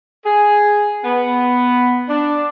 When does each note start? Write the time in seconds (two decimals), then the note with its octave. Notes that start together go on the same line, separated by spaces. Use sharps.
0.25 G#4
1.04 B3
2.09 D4